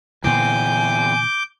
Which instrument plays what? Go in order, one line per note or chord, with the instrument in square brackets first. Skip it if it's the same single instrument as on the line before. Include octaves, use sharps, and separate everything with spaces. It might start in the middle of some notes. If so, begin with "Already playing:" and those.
[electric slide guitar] E2 C4 [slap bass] A#2 D3 E3 [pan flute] G#5 [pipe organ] D6 G6